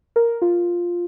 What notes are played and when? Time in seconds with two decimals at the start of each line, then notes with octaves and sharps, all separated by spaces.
0.16 A#4
0.42 F4